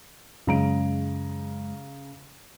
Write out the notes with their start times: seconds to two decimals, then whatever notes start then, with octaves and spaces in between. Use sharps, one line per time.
0.47 F#2 C#3 G#3 A#5 D7